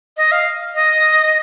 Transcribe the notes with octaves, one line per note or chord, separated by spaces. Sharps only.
D#5
F5
D#5